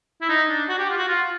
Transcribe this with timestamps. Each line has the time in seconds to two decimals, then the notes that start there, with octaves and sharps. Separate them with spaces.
0.22 E4
0.29 D#4
0.49 D4
0.69 F#4
0.79 G4
0.90 F4
0.98 F#4
1.08 F4